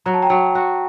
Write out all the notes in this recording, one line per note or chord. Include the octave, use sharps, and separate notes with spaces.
F#3 A#5
A5
G5 A#5
F#3
F#4